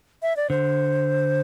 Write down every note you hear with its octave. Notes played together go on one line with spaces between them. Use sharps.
E5
D5
D3 C5